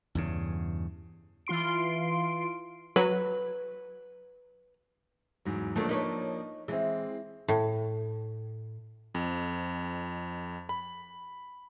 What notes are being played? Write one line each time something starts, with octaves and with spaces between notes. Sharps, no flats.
E2 G2 C#3
E3 F4 C6 D7
F#3 B4
E2 G#2 F#3
D3 F3 F#3 A3 A#3 D4
D#4 B4 C#5
E3 G#3 C4
A2
F2
B5